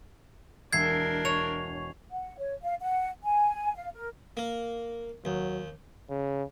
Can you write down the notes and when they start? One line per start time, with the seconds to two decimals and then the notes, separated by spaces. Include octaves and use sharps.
0.73 E1 D4 A#4 E5 G#6 C7
1.25 C#5 E7 F7
2.11 F#5
2.38 C#5
2.64 F5
2.81 F#5
3.24 G#5
3.75 F5
3.94 A#4
4.37 A#3
5.25 D#2 F#3
6.10 C#3